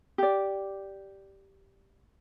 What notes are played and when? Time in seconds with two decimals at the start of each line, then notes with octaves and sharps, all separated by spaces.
0.18 G4 D5